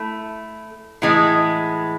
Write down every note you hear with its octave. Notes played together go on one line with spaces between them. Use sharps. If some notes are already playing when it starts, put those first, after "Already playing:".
Already playing: A3 E4
A2 E3 G#3